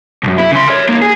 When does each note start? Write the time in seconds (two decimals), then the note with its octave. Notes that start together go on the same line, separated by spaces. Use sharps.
0.23 B1 F#2
0.38 E4
0.52 C#3 C6
0.68 A#4 C#5
0.89 E2 A#3
1.02 G#4